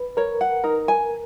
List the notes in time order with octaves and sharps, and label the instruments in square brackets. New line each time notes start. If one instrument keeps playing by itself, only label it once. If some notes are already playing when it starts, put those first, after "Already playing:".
Already playing: [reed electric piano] B4
[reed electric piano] A#4 [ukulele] C#5
[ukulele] F#5
[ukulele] D#4 [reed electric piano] A#4
[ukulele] G#5